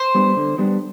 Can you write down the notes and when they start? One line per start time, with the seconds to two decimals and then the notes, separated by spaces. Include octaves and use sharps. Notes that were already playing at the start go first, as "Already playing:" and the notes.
Already playing: C5
0.15 G3 B3 D4
0.37 D3
0.58 G3 B3 D4